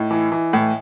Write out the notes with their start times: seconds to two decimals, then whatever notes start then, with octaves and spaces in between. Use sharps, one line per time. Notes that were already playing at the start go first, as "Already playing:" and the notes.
Already playing: A2 D#4
0.11 E3
0.32 E3
0.53 A2